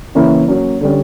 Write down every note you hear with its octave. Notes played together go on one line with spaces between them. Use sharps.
C#3 E3 A#3 C#4 E4
F#3 A#3 C#4
D3 G3 C#4